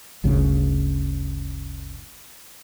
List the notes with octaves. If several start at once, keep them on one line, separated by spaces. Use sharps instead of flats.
G1 D2 C#3